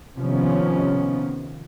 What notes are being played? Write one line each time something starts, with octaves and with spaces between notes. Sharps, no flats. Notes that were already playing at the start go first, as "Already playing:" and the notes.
C3 D#3 F3 B3 C#4